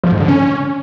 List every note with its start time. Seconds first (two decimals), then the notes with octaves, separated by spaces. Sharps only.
0.04 F3
0.12 G#2
0.20 D3
0.28 C#4